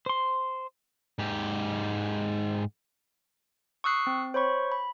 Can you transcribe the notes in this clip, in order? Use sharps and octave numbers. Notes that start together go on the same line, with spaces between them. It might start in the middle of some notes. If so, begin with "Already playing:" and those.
C5 C6
G#2 G4
C#6 D#6 E6 F#6 C7
C4
C5 C#5 B5 C#6
B5